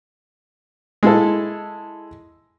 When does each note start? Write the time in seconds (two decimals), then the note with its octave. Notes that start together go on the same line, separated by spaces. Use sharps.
1.03 G#3 E4 A4